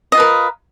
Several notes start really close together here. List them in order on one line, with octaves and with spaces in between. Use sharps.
D#5 F4 B4 A#4